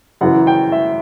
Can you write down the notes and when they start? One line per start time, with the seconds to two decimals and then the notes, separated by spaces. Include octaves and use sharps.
0.21 F#2 C#3 E3 F#5
0.47 G5
0.72 E5